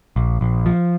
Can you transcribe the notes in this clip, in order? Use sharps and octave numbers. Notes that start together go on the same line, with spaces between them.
A#1
A#1
F3